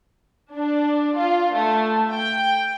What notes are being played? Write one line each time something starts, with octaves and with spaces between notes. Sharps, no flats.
D4
F4
A3
G5